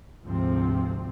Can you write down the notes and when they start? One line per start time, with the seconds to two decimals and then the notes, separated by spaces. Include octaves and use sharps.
0.25 D2 G#2 C3 F3 C4